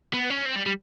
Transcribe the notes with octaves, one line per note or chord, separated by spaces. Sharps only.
B3
C#4
C4
G3
G3